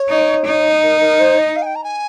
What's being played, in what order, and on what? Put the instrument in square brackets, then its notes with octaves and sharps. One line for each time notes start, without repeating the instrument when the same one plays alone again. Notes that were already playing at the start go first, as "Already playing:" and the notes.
Already playing: [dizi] C#5
[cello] D#4
D#4
[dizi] A#4
A#4
C5
D#5
F5
G#5
G5
A#5
G#5